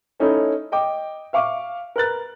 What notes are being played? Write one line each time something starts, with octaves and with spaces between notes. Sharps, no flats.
A3 C#4 D#4 E4 A4
D#5 G5 D6
E5 F5 C#6 D6
A#4 B4 F#6 A6